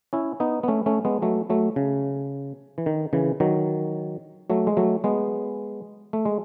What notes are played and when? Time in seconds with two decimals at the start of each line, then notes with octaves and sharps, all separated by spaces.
0.13 C#4 E4
0.40 B3 D#4
0.63 B3
0.68 A3 C#4
0.86 A3 C#4
1.05 G#3 B3
1.22 F#3 A3
1.50 F#3 A3
1.76 C#3
2.78 E3
2.86 D#3
3.13 C#3 E3
3.40 D#3 F#3
4.50 F#3 A3
4.67 G#3
4.77 F#3 A3
5.04 G#3 B3
6.13 A3
6.25 G#3